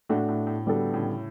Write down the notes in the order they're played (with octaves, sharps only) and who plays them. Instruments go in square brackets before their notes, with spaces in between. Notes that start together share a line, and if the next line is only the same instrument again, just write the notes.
[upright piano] A2 [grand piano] A3 D4 F#4
[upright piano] A2
A2
[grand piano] D3 G3 B3 F#4 A4
[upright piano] A2 C#3